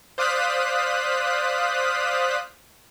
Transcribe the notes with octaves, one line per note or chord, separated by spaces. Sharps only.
C5 D5 F5 D#6 F#6 B6